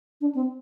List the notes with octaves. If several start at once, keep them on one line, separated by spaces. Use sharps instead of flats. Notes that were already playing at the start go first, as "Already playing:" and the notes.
D4
C4